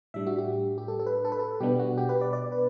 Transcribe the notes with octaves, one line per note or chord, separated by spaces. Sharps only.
A2 G3 D4 E5
F#4
G4
G4
A4
A4
B4
A4
B4
A4
B2 G3 B3 D4 G4
F#4
G4
B4
D5
D5
B4